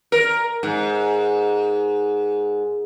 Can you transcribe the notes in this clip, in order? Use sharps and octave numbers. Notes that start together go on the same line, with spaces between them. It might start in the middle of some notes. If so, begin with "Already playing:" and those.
A#4
G#2